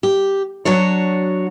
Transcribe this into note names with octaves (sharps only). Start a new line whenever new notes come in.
G4
F#3 D4 F#4 C#5